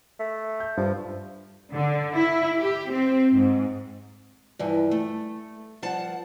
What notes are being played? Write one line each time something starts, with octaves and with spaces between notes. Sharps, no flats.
A3
G6
G2 F3
D3
E4
G4
C4
G#2
G2 E3 F3
A3
G2 F3 F#5 A5